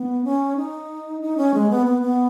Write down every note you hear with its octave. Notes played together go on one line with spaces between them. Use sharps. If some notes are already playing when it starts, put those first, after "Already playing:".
Already playing: B3
C#4
D#4
D#4
C#4
G#3
B3
B3
B3